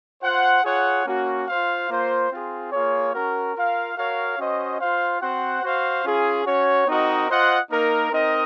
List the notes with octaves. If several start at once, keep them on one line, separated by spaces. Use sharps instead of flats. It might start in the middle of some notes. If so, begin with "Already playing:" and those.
F4 C5 F#5
F4 G#4 C#5 F#5
A#3 C#4 F#4
F4 C5 F5
A#3 F4 C5
C4 F4 G#4
A#3 F4 G#4 C#5
C#4 F#4 A#4
F4 A#4 F5
F#4 A#4 C#5 F5
C#4 F#4 C5 D#5
F4 C5 F5
C4 F#4 C5 F#5
F#4 C5 F5
C#4 F4 G#4
C#4 F#4 C#5
C4 D#4 F#4 A#4 D#5
F4 C5 D#5 F#5
A#3 D#4 A#4
C4 D#4 A#4 D#5